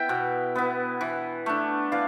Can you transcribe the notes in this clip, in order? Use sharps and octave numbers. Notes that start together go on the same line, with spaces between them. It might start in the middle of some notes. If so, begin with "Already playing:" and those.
Already playing: B3 E4 E5 G5
B2
B3 E4
E3
A3 D4
E3 D5 F5